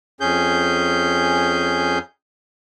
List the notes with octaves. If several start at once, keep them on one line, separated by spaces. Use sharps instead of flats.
F2 C#4 G#4 G6